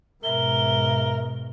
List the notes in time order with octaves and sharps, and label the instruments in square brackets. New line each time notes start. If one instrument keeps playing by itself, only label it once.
[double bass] G#2 B2 [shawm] A#4 [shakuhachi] E5 [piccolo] G7